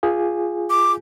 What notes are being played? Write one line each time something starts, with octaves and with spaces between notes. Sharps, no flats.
F4 G#4 G#5
D6